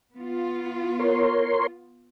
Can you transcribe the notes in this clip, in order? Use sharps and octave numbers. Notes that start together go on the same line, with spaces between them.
B3 F4
A#4 C#5 C6